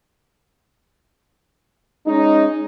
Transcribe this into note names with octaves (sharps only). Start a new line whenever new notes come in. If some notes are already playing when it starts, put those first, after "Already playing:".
G#3 C#4 D#4